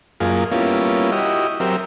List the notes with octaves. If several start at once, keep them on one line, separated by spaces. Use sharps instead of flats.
F#2 A#3 F4 G#4
G3 A#3 B3 C#4 E4 F4
E4 F#4 G4 D#5
F#3 C4 G4 A#4 E5